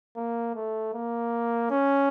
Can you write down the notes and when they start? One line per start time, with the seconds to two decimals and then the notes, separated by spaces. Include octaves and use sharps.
0.16 A#3
0.55 A3
0.94 A#3
1.71 C#4